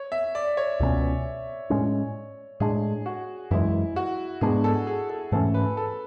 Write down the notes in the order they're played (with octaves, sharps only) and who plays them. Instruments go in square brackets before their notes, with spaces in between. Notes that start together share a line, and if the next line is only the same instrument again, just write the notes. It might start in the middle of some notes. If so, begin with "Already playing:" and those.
Already playing: [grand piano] C#5
E5
D5
C#5
[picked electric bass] C#2 B2 A3 C#4
A2 G#3 C#4
[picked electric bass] A2 G#3 D4 [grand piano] G#4
[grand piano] F#4
[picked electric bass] F#2 E3 G#3 [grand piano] E4
[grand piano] F#4
[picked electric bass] G#2 G#3 B3 D4 [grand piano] G#4
[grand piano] A4
G#4
A4
[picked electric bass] G#2 E3 A3 C#4 [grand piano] A4
[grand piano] B4
A4